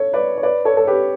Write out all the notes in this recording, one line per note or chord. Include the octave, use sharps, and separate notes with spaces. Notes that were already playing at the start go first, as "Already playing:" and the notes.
Already playing: A4 C#5
B4 D5
C#5
B4 D5
A4 C#5
A4
G4 B4